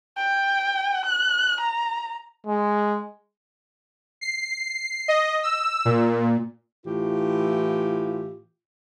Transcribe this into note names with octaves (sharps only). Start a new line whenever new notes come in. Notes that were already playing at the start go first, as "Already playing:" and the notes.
G5
F#6
A#5
G#3
C7
D#5
E6
A#2
A2 E3 F4 G4